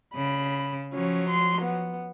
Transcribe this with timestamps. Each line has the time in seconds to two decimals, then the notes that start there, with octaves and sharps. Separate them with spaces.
0.15 C#3 B5
0.93 F3 F#3 C#4
1.30 C6
1.62 B3